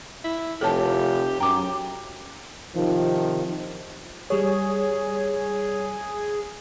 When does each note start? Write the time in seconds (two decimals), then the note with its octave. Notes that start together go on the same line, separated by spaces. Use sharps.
0.24 E4
0.61 F1 G4 A4 C#5 A5
1.40 F#2 G5 A#5 D6
2.74 C3 D#3 F3
4.30 G3 G#4 C#5